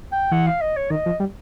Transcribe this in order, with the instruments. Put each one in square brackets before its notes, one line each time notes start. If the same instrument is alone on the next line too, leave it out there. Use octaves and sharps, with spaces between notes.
[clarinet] G5
[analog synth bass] E3 [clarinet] F#5
[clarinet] F5
D#5
C#5
[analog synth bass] D#3 [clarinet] D#5
[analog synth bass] F3
G3